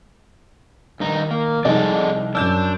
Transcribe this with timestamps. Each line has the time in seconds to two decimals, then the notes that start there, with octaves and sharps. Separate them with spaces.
1.00 G2 D#3 D#4
1.31 A#3
1.65 C2 F3 G3 G#3 D#4 G#4 A4 D5
2.35 F#2 D4 E6 G6 E7